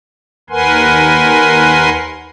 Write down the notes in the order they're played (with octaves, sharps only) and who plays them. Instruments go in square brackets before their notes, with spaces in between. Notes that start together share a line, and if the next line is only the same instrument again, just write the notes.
[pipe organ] D#2 A#4 B4 F#5 G#5 C6